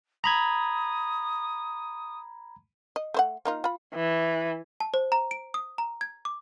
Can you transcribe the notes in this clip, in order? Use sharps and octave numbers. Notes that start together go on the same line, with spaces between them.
A#5 B5 D#6 G#6
D#5
A3 C5 F#5
A#3 D#4 F4
F4 B5
E3
A5
C5
A#5
D7
D#6
A#5
G#6
D6